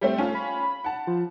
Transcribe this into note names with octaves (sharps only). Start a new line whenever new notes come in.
G3 A3 C4
A3 C#4 F4
B5
F#5 A5
F3